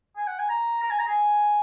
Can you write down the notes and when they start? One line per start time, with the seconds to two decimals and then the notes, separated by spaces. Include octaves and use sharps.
0.17 G#5
0.27 F#5
0.39 G#5
0.49 A#5
0.83 A#5
0.90 G#5
0.99 A#5
1.08 G#5